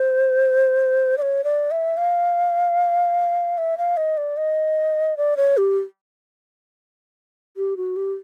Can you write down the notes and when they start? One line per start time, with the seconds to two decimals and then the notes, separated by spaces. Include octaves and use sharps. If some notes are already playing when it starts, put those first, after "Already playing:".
Already playing: C5
1.18 D5
1.22 C#5
1.44 D5
1.71 E5
1.97 F5
3.58 E5
3.78 F5
3.97 D#5
4.17 D5
4.37 D#5
5.17 D5
5.37 C#5
5.57 G4
7.57 G4
7.77 F#4
7.96 G4